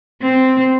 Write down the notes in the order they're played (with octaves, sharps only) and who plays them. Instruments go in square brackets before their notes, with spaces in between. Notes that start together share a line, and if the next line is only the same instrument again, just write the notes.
[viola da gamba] C4